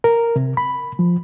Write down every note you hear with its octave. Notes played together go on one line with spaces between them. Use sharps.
A#4
C3
B5
F3